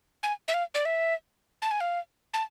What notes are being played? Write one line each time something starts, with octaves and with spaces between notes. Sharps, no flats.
G#5
E5
F5
D5
E5
A5
G#5
F5
A5